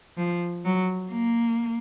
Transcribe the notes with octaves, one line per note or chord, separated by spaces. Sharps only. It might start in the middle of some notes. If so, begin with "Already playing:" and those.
F3
F#3
A#3